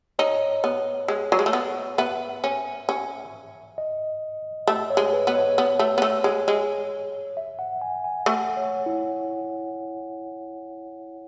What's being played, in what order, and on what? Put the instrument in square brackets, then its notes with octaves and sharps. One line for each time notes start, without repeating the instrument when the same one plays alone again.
[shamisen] D#4 [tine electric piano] C#5
[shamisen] B3
G#3
F#3
G#3
A3
B3
[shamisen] B3 [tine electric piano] E5
[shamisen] C#4
C#4
[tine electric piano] D#5
[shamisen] A3 [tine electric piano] E5
[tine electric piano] C#5
[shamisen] G#3
[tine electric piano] B4
[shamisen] B3
[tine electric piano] C#5
[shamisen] B3
A3
B3
A3
G#3
G#3
[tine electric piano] E5
F#5
G#5
G#5
[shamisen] A3 [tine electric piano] F#5
[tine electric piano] C#5
E4